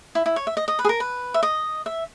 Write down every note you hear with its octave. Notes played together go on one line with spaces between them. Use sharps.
E4
E4
C#5
E5
D#5
D#5
B4
G#4
A#4
B4
E5
D#5
E5